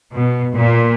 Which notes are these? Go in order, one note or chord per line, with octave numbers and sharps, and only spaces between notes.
B2
A#2